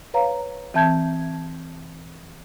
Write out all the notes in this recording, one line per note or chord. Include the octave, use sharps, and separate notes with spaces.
B4 C#5 F5 A#5
E3 C4 E5 A5 G6 G#6